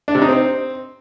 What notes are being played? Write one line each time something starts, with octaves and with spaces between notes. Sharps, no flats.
D4
C3
D#4
C4